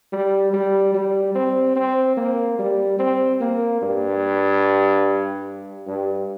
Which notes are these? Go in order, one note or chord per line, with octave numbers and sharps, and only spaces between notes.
G3
G3
G3
C4
C4
A#3
G3
C4
A#3
G2
G2